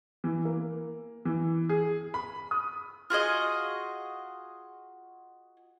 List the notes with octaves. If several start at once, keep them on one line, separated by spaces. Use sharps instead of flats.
E3
A#3
E3
G#4
B5
D#6
F4 F#4 G#4 D#5